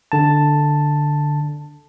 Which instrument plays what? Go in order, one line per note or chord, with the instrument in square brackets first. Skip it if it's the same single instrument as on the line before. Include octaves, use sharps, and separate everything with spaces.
[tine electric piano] D3 A5